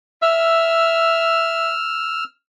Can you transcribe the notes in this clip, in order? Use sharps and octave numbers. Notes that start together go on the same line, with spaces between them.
E5 E6 F6